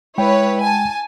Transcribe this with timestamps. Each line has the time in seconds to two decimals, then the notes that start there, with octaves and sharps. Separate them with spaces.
0.18 G#3 E4 B4 C#5 G5
0.63 G#5 A5